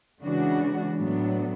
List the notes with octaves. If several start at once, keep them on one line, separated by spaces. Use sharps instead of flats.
C#3 E3 G#3 D4 F#4
A2 F#3 B3 D4